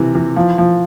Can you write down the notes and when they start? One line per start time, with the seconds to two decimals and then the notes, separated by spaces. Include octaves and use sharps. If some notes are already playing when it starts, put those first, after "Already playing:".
Already playing: C3 E3
0.15 E3
0.36 F3
0.58 F3